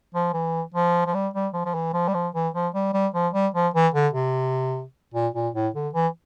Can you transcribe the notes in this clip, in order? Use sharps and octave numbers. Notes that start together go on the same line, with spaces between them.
F3
E3
F3
F3
G3
G3
F3
F3
E3
F3
G3
F3
E3
F3
G3
G3
F3
G3
F3
E3
D3
C3
A#2
A#2
A2
D3
E3